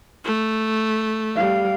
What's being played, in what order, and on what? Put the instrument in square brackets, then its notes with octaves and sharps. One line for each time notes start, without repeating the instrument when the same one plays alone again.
[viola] A3
[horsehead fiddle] G3 F5